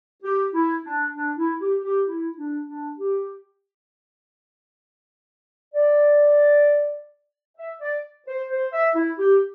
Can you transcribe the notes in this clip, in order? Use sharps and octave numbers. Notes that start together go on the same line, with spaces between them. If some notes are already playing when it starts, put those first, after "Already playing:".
G4
E4
D4
D4
E4
G4
G4
E4
D4
D4
G4
D5
E5
D5
C5
C5
E5
E4
G4